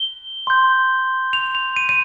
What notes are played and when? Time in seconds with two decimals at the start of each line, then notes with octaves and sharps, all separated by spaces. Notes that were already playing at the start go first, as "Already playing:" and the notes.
Already playing: G7
0.47 C6 G6
1.33 F7
1.55 F7
1.76 D#7
1.89 D#7